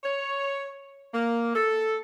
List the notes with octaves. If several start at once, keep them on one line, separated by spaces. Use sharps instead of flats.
C#5
A#3
A4